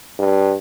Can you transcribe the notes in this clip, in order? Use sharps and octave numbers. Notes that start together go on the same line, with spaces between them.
G2